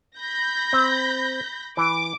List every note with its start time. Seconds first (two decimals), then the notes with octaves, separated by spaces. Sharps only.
0.18 B5 G6 A#6
0.73 C4
1.77 E3 D6